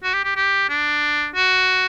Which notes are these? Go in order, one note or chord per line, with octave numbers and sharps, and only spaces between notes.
F#4
G4
G4
G4
D4
F#4